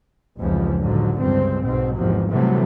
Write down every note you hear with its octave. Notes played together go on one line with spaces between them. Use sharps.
F1 C#2 E3 F3
A1 G#2 D3 F3 F#3
C#2 G2 C4
B1 G#2 B2 C4
G#1 E2 C3 F3 F#3
C3 E3 F#3 G3 A3 B3